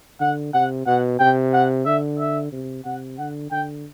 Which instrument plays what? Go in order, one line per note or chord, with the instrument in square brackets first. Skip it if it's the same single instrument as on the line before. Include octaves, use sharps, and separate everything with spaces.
[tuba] D3 [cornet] F#5
[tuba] C3 [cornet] F#5
[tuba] B2 [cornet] F#5
[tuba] C3 [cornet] G5
[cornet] F#5
[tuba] D3 [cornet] E5
[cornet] E5
[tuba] C3
[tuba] C3 [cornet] F#5
[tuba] D3 [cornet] F#5
[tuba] D3 [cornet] G5